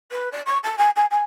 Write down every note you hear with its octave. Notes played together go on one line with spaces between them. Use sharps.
B4
D5
C#6
A5
G#5
G#5
G#5